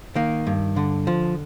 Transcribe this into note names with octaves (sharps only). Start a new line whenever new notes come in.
D#3 A#3
G2
D3
F3